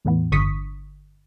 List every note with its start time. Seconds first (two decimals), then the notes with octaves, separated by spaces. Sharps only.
0.05 E2 A2 E3 B3
0.32 G1 D3 C#6 D#6 B6